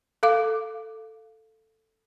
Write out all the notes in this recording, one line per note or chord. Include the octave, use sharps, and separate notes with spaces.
A4 F5 D6